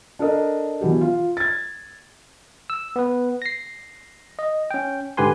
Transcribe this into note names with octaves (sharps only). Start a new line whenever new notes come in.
D4 A4 A#4 D#5
B2 E3 F#3 G4
F4
G#6 A6
E6
B3 B4
A#6 C7
D#5
C#4 G5
G#2 D3 G4 B4 G#5 C6